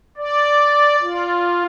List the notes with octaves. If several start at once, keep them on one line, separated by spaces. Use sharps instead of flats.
D5
F4